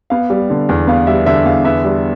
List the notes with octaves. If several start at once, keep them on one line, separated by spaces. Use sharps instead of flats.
B3 F5
G3
D3
E2
B3 F5
G3 E5
D3 E5
E2 F5
B3 E5
G3